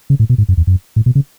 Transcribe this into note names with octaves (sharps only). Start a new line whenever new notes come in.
C#3
A2
B2
G#2
F#2
E2
F#2
A2
B2
C#3